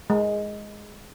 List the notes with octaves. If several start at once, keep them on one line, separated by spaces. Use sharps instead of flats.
G#3